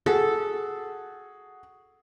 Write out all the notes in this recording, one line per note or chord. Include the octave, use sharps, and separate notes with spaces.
F#4 G#4 A4 F#5